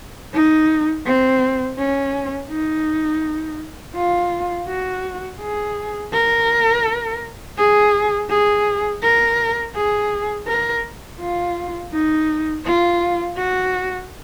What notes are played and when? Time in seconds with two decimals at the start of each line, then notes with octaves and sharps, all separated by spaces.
0.34 D#4
1.06 C4
1.78 C#4
2.51 D#4
3.96 F4
4.68 F#4
5.40 G#4
6.13 A#4
7.58 G#4
8.30 G#4
9.03 A#4
9.75 G#4
10.48 A#4
11.20 F4
11.93 D#4
12.65 F4
13.37 F#4